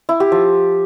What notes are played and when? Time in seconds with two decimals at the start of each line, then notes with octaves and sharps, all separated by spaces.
0.09 E4
0.20 G4
0.32 F3